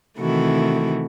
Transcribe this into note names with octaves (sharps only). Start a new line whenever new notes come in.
C3 D#3 E3 A3 E4 F#4